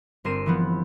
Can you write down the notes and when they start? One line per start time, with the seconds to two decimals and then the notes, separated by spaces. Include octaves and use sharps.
0.24 G1 C4 A#4 C7 D#7 E7
0.46 E3 F3 B3